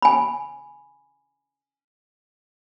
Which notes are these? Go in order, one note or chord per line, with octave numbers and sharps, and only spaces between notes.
G#5 B5